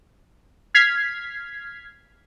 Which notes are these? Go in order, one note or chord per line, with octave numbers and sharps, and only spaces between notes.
F6 G#6 B6 C7